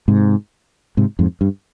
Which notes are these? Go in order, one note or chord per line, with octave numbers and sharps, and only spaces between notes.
G#2 C3
G#2 C3
F2 G#2
G2